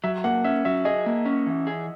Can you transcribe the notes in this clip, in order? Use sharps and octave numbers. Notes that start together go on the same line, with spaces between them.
F#3 E5
A#3 F#5
C#4 E5
F#3 E5
G#4 D#5
A#3
C#4
E3
G#4